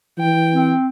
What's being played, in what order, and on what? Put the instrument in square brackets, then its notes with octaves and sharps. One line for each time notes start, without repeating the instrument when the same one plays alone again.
[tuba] E3 [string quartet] G5
[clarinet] C4